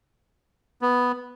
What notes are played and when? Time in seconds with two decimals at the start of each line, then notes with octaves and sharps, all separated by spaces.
0.82 B3